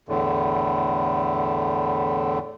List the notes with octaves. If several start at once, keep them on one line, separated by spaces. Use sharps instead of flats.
E2 A2 D3